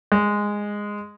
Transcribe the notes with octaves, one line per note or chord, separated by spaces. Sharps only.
G#3